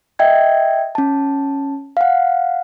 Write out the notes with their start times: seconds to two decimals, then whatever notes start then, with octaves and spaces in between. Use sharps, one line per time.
0.19 D#5 E5 G5 G#6
0.95 C#4 A5
1.97 F5 F#5